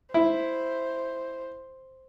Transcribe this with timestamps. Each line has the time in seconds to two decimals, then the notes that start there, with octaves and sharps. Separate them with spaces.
0.14 E4 C5